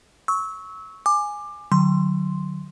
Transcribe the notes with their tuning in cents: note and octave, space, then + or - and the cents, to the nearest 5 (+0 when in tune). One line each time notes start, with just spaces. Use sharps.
C#6 +0 E6 -25
G#5 +0 D6 +20
D3 +40 F#3 +0 C6 +0